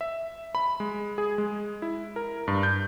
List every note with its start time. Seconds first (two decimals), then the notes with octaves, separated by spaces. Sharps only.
0.01 E5
0.55 B5
0.80 G#3
1.18 G#4
1.38 G#3
1.82 E4
2.16 A#4
2.48 G2
2.63 G6